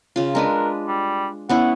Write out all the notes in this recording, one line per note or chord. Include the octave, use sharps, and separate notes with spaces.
C#3 F4
G#3 D4 A#4 B4
G3
B3 C#4 E4 F#5